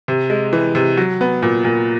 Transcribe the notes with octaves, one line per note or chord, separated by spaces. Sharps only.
C3
G#3
E3
C3
F#3
B3
A#2
A#2